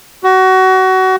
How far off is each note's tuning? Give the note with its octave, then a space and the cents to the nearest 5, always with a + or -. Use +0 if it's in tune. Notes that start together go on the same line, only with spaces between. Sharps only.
F#4 +25